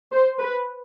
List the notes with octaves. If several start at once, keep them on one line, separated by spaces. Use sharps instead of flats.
C5
B4